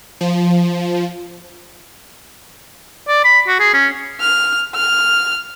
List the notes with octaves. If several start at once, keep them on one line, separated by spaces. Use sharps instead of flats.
F3
D5
B5
F#4
G#4
C#4
F6
F6